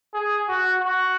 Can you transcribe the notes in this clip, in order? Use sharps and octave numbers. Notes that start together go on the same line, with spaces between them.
G#4
F#4
F#4